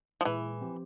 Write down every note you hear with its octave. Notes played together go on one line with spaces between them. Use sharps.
F3
A#2 E3 G#3 E4 G#4
F3 C4 G4